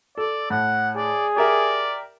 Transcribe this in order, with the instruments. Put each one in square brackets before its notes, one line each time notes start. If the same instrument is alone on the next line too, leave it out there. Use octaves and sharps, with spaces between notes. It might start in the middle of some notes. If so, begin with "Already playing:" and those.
[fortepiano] A4 [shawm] D5
[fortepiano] A2 [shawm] F#5
[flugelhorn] G#4 [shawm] D5
[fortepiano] G4 A#4 E5 [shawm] D5